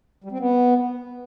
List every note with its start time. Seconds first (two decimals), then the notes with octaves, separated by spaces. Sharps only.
0.24 G3
0.32 C4
0.39 B3